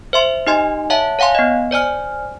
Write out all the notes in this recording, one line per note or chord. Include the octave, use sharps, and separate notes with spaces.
C5 E5 C6
D#4 G4 D#5 G#5 C6
C#5 E5 F#5 A5
C#5 F5 F#5 G#5 C6
B3 D#5
C5 D5 G#5 F6